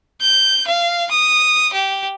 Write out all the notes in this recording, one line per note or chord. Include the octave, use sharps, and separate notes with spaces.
G6
F5
D#6
G4